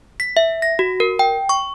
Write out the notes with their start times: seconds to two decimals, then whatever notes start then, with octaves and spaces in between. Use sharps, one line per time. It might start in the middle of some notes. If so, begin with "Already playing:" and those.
0.20 B6
0.37 E5
0.62 A#6
0.79 F#4
1.00 A#4
1.19 G5
1.49 C#6